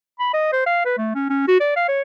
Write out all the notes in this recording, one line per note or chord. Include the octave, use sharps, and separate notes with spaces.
B5
D#5
C5
F5
B4
A3
C#4
C#4
F#4
D5
F5
C#5